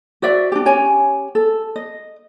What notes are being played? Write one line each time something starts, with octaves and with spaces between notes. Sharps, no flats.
F#4 C5 D5 E5
D4 G4
C#4 G4 C#5 G#5
A4
D#5